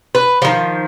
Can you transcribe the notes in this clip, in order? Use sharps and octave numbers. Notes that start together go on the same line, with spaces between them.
B4
D#3 F3